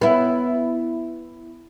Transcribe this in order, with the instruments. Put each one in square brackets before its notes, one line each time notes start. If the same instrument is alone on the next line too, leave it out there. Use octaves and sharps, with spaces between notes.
[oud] B3 E4